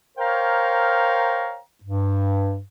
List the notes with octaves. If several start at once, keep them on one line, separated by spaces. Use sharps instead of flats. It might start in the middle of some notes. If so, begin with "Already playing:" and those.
A#4 C5 C#5 F5 G5 A#5
G2